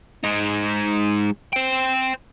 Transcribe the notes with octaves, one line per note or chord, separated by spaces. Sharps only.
G#3 D#4
C5 G5